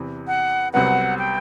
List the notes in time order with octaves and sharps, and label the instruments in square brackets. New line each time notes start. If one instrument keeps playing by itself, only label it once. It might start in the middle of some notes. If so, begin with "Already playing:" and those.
Already playing: [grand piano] E2 C3 E3
[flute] F#5
[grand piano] C2 C3 F#3 B3 [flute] F#5
[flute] G5